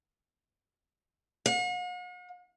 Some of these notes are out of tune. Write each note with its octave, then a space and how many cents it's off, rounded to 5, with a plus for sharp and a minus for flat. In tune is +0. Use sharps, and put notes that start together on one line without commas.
F#5 -45